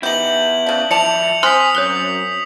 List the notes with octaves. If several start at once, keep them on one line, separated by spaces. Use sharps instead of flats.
B3 D#4 E4 G4 G6 F#7
C#3 D4 F5
F3 E4 D5 A5 C#7 F7
C4 G#5 C6 D#6 F6 F#6 B6
F#2 C#5 F#6 G7